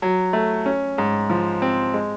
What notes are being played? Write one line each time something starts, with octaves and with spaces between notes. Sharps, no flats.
F#3
A3
C#4
G#2
F3
C4
G#3